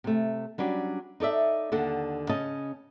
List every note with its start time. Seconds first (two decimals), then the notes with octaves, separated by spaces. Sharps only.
0.04 C3 A3
0.58 F#3 G3 C#4 D4
1.20 D#4 A4 D5 E5
1.72 D#2 D3 D4 A4 F#5
2.29 C#3 C#4 D#5 A5